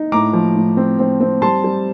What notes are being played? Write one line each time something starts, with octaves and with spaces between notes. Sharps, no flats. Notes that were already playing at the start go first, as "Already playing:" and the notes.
Already playing: D#4
A2 A#5 D6
F3
A2
C4
C4
C4
G3 A5 C6
G3